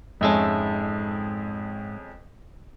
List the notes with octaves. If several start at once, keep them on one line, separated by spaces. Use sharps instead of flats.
F2 G#2 G#3 C#4 E5 A5